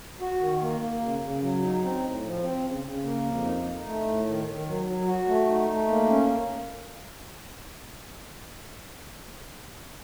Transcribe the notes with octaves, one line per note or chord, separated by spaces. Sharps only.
F#4
D#3
A#3
A#3
C#3
C#3
F#3
D#4
C4
A2
F3
C4
C#3
C#3
A#3
F2
D#4
D#4
A3
A2
D#3
D#3
F#3
F#3
F#4
A3
D#4
A3
A#3
C#4